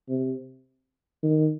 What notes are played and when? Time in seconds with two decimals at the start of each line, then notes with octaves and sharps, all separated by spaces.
0.09 C3
1.23 D#3